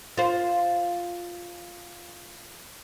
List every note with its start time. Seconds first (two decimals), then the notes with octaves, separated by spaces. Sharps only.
0.17 F4 C5